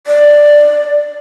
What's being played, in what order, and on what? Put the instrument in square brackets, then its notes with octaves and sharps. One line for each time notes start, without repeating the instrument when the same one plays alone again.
[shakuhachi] D5